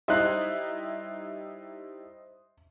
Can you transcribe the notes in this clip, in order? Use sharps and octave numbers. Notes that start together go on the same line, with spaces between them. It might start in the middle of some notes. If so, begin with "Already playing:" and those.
G3 D#4 E4 C5 D#5 E5 C6 F#6